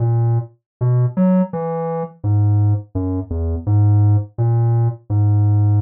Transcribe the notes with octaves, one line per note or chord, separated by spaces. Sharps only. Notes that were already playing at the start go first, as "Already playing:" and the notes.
Already playing: A#2
B2
F#3
E3
G#2
F#2
E2
G#2
A#2
G#2